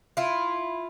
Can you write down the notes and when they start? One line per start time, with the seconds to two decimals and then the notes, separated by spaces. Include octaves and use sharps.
0.17 E4 F4